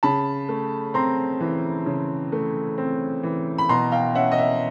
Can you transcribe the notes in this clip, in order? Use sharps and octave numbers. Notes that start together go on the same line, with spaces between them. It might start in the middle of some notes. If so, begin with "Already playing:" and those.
C#3 A5 B5
A3
C4 A#5 C6
E3
C#3
A3
C4
E3
B5
B2 A#5 C6
F5 G5
C#4 E5 F#5
D#5
E5